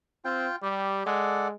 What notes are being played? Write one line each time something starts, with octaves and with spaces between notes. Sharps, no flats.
C4 F4 G5
G3 G4
G#3 A4 D5 F#5